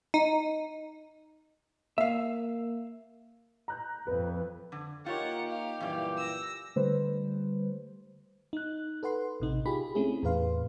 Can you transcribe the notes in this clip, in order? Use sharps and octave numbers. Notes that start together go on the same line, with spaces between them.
D#4
A#3 E5 F5
A#5 F#6 G6
F2 B4
D3
A#3 D#4 F4 G4 C#5 F#5
F5
F#2 A#2 E3 G3
E6 A#6
D3 G3 A3 B4 C5
D#4 F#6
A4 B4 F#5 C6
A1 C3 D#4
F4 G4 G#4 B5
A3 C4 C#4 E4 G#4
E2 A2 B4 F5 C6